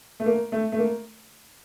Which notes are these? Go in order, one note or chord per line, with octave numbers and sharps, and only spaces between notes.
A3
A#3
A3
A3
A#3